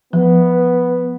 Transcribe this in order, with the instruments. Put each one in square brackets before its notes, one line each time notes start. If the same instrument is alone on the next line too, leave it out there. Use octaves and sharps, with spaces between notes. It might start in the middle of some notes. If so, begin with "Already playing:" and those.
[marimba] F3 [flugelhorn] B3